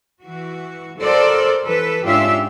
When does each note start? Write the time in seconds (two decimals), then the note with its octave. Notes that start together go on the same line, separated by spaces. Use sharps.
0.22 E3 F#4
0.98 F#4 A4 A#4 C5 D5
1.66 E3 A4 B4
2.05 G#2 C#4 D4 F4 G4 E5